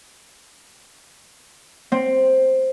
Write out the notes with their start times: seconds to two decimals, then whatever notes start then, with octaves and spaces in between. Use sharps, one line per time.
1.92 C4